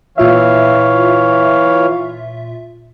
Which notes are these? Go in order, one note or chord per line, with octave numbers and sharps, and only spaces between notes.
A#2 E3 F4 C#5 E5 F5